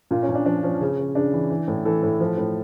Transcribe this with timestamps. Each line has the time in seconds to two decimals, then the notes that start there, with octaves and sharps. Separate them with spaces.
0.11 A#2 F4
0.23 C#4
0.29 A#2
0.35 D4
0.45 F3 D4
0.63 F3 C#4
0.81 C#3
0.99 C#3
1.15 C#3 D4
1.33 E3
1.50 E3
1.68 A2
1.85 E3 A4
2.03 A2
2.20 F3
2.37 A2